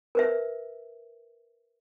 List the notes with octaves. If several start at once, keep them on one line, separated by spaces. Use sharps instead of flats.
A#4 B4 E5